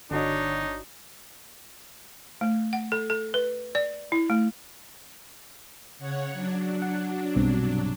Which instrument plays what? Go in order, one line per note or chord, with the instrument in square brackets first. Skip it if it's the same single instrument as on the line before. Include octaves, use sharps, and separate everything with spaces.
[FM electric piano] G1 F#4 D#5 [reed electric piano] D3 [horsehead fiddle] D4 C#5 [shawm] D#4
[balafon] A3
F#5
A4
A4
B4
D5
E4
A3
[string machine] C#3 C#5 F#5
F#3 D4
[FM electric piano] F#5
B1 G2 C3